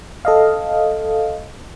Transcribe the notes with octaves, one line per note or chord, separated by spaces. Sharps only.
A4 D#5 F5